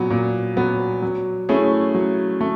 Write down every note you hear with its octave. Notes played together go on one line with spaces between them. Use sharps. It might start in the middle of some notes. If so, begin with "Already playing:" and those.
Already playing: A#2 F#3 B3
A#2
F#3 B3
F#3
A3 C#4 E4 G#4
F#3
A3